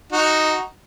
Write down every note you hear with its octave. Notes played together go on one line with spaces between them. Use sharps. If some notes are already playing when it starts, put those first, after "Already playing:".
D#4 F#4